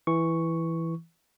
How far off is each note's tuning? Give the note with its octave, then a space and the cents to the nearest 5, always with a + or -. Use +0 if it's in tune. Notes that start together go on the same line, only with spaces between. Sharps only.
E3 +0 C#6 +0